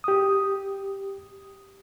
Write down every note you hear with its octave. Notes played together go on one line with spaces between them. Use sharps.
G4 D#6